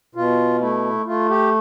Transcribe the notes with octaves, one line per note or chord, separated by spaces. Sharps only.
B2 F4
A3 E4
A3 F4
G4